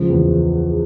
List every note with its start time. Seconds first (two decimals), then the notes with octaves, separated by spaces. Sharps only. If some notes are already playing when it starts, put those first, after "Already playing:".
Already playing: C#2 F3
0.10 E2